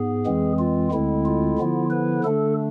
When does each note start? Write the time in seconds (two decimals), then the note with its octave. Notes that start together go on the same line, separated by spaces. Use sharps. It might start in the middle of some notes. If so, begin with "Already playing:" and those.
Already playing: G#2 B3 G#4
0.26 F2 E3 G#3 C4
0.59 F4
0.91 D2 D3 G#3 C4 E4
1.25 F4
1.58 D3 F3 B3 E4
1.90 B4
2.24 D3 A3 D4 A4